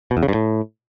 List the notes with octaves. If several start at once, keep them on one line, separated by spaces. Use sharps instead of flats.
B2
E2
C#3
G2
A2